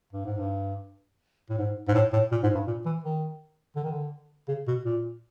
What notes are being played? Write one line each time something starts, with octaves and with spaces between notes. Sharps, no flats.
G2
G#2
G2
A2
G#2
G#2
A2
A2
A#2
G#2
G2
A#2
E3
D#3
D3
D#3
D3
C#3
B2
A#2